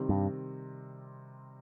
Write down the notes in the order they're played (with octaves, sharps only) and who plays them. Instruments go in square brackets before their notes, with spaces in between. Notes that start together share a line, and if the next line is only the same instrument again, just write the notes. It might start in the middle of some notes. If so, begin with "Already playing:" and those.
Already playing: [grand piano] C3 D#3 G3 C4
[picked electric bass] G2